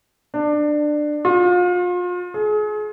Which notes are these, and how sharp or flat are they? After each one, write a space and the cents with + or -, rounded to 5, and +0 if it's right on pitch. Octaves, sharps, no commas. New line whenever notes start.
D4 +20
F4 +35
G#4 +35